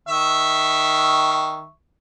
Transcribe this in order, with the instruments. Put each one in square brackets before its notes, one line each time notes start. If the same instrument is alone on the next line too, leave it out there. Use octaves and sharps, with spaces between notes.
[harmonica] D#3 E5 C#6